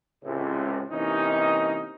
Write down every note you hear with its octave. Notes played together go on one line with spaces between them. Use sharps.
C#2 A2 C3
C3 E3 A#3 C#4 D#4